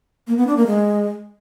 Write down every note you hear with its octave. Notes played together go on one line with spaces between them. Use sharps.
A#3
B3
D4
A#3
G#3